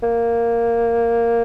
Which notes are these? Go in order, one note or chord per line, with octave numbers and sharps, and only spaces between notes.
A#3